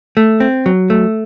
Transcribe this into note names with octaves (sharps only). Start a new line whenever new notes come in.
A3
C4
F#3
A3